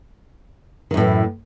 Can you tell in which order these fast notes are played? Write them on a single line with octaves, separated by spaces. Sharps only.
D#3 F#2 A2 E3